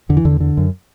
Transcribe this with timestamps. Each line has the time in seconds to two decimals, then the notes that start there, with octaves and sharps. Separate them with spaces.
0.09 E2 D3
0.17 E3
0.25 E2 D3
0.40 D3
0.57 F#2